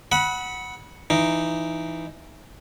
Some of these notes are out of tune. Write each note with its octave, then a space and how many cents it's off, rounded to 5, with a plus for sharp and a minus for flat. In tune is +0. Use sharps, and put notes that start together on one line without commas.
F#5 +0 B5 -20 D#6 +45
E3 +15 D#4 +0